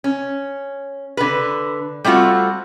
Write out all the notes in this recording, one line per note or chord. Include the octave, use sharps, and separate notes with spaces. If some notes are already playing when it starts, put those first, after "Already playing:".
C#4
D3 B4
G3 A3 C4 F4 F#4